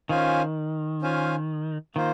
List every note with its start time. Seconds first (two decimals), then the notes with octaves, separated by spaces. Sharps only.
0.09 D#3 C#4 F4 C5 F5 G#5
1.02 C#4 F4 C5 F5 G#5
1.96 D#3 A#3 F4 C5